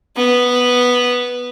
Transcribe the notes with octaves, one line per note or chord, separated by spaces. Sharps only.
B3